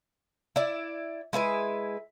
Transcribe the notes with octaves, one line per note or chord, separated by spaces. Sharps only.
E4 D5
G#3 E4 B4 G#5